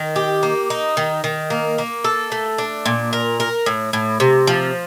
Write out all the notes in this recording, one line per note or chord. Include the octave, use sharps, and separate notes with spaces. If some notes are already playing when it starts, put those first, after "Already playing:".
Already playing: D#3
G4
A#3
D#4
D#3
D#3
A#3
A#3
A4
A3
D4
A#2
A#4
A#4
A2
A2
C3
F3